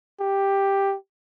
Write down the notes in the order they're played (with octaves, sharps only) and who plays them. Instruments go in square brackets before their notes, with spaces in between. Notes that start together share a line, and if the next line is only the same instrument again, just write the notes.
[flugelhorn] G4